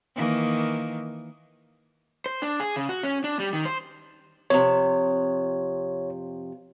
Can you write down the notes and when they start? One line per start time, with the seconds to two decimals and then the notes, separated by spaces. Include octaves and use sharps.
0.16 D#3 E3 A#3
2.26 C5
2.42 D4
2.60 G#4
2.76 C#3
2.89 F#4
3.03 C#4
3.24 D4
3.40 G3
3.53 D#3
3.65 C5
4.50 F2 C3 C#5